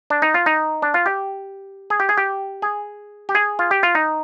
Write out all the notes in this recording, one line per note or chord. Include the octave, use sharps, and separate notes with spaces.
D4
D#4
F4
D#4
D4
F4
G4
G#4
G4
G#4
G4
G#4
G4
G#4
F4
G4
F4
D#4